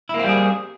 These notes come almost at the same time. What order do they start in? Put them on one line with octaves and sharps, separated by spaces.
E4 A#3 C4 G3 G#4